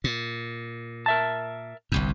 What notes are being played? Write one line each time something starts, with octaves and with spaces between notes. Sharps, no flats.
A#2
A#4 E5 A5
G1 C2 G2